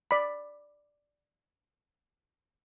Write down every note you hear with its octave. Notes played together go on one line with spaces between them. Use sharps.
D5 B5